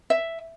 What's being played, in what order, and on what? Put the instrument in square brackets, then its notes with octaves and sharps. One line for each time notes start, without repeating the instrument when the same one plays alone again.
[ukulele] E5